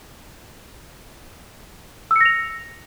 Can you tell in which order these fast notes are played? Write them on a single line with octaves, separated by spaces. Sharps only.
E6 C#7 A#6 F7